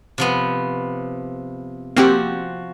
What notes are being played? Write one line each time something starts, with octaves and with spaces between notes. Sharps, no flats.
C3 F3 B3
F3 A#3 C4 F#4 G4 F#5